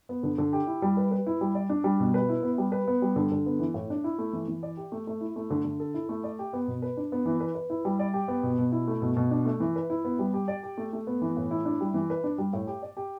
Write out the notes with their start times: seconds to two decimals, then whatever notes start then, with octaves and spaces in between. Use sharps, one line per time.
0.09 B3
0.23 D3
0.38 D3
0.53 G4
0.67 E4
0.82 G3
0.97 B4
1.11 B4
1.27 E4
1.41 G3
1.55 D5
1.69 D4
1.84 G3
2.00 B2
2.14 B4
2.29 E4
2.43 B3
2.58 G3
2.72 B4
2.88 B3
3.02 G3
3.16 D3
3.32 D3
3.46 B3
3.60 E3
3.74 A2
3.90 D4
4.04 E4
4.19 A3
4.33 E3
4.48 E3
4.63 D5
4.77 G4
4.92 A3
5.07 A3
5.21 E4
5.36 A3
5.50 D3
5.65 D3
5.80 A4
5.94 E4
6.09 A3
6.24 D5
6.39 G4
6.53 B3
6.68 B2
6.82 B4
6.97 D4
7.12 B3
7.26 E3
7.40 B4
7.55 B4
7.70 E4
7.85 G3
7.99 D5
8.14 G4
8.28 B3
8.43 B2
8.59 B2
8.72 E4
8.88 A3
9.02 B2
9.17 B2
9.31 D4
9.45 A3
9.60 E3
9.76 B4
9.90 E4
10.05 B3
10.19 G3
10.34 G4
10.48 D5
10.63 G4
10.78 A3
10.93 A3
11.07 B3
11.22 E3
11.37 A2
11.51 E4
11.65 D4
11.81 G3
11.94 E3
12.10 B4
12.24 D4
12.38 G3
12.53 A2
12.67 G4
12.82 D5
12.97 G4